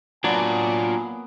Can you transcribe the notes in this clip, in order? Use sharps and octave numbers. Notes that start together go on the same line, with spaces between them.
F#3 A#3 B3 D4 F4 D5 G#5